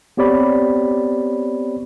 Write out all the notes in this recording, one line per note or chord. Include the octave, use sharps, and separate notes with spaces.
B3 C4 G4 C#5 D5 B5